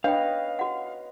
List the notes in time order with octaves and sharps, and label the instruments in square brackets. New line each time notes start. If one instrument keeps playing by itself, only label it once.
[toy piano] D4 G5 [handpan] B4 C#5 D#5 [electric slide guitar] F5
[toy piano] F#4 F#5